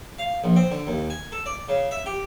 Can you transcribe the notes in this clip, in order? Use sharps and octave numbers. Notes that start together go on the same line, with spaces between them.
F5
A#1
C4
D3
D#2
G#5
A4
D5
C#3
E5
G4